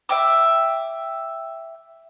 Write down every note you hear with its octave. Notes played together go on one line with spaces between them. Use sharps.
E5 G5 D6